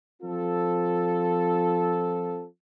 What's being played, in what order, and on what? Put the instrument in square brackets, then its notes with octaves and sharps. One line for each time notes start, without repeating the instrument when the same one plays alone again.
[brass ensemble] F3 C4 F4 A4